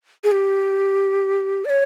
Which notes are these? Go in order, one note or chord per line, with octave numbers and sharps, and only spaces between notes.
G#4
G4
D5
C#5